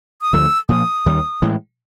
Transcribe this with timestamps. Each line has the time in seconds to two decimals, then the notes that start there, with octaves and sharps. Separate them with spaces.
0.22 D#6
0.33 D2 D3 F3 A3 E6
0.69 A#2 F3 A#3 D#6
1.06 D#2 D#3 G3
1.42 A2 E3 G#3